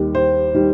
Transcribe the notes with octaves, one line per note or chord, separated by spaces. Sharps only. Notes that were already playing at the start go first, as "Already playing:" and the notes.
Already playing: D#2 D#3 G3
C5
D#3 G3